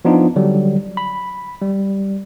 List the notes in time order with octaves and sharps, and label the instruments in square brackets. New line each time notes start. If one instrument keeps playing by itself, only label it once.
[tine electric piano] F3 B3 D4 D#4 F4
D3 F#3 G3
B5
G3